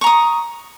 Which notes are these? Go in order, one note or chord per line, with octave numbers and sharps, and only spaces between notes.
A#5 C#6 D#6